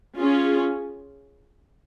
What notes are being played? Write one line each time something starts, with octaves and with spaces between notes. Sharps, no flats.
C#4 F4 G#4